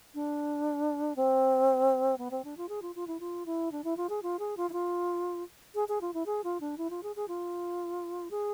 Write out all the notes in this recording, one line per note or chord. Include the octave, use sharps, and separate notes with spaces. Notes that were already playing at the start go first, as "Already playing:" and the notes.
D4
C4
B3
C4
D4
F4
G#4
F4
F4
E4
F4
E4
D4
E4
F4
G#4
F4
G#4
F4
E4
F4
G#4
G#4
F4
E4
G#4
F4
D4
E4
F4
G#4
G#4
F4
G#4